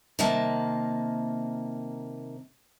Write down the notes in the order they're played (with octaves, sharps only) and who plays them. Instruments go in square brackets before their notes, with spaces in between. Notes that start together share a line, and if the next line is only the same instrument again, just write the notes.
[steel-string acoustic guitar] C3 D#3 A#3 A5